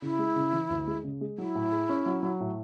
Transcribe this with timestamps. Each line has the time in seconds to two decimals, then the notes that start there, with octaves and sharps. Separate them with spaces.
0.02 C#3 E4
0.19 G#3
0.36 C#3
0.53 E3
0.70 D2
0.87 G#3
1.04 C#3
1.21 G#3
1.38 F#3 E4
1.55 A2
1.72 G#4
1.89 C#4
2.06 F#3
2.23 F#3
2.40 A2